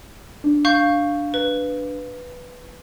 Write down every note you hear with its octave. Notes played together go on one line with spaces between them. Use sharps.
D4
F5 C#6 G6
B4